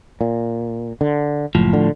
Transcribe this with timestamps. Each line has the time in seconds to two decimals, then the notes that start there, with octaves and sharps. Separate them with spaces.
0.21 A#2
1.01 D3
1.55 F#1 A2 F3
1.73 D3